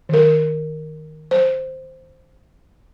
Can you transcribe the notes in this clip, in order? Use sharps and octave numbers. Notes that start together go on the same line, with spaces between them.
D#3 A#4
C5